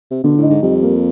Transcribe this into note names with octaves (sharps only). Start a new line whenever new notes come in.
C3
B2 D3
A2
D#4
G#2
F2 G3
A#3